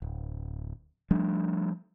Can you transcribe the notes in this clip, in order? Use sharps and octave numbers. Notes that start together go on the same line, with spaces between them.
D1
F3 G3 A3 D4